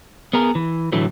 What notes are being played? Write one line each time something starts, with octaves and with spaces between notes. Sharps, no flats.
B3 G#4 A#4
E3
A2 D3 E3 F#3 A3